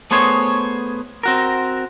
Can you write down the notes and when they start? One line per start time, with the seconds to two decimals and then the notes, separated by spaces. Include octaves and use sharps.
0.11 A3 B3 G#4 C5 C#5
1.23 C4 F#4 A#4